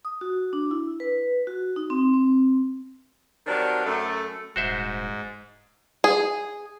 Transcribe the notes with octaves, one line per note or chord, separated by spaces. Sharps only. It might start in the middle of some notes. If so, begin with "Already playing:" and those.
D#6
F#4
D4
E4
B4
F#4
D#4
C4
C4
D#3 F#3 G3 C4 D4
F#2 A3
D#1 G#2 F#4 C5 E5
G#4